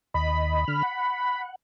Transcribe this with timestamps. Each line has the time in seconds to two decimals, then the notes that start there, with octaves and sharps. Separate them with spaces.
0.14 D#2 D#5 B5
0.68 D3 F6
0.83 F#5